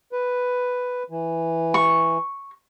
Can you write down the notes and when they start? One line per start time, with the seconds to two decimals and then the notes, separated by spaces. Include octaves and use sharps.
0.12 B4
1.10 E3
1.74 C#6